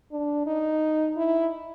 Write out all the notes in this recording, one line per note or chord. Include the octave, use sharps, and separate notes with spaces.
D4
D#4
E4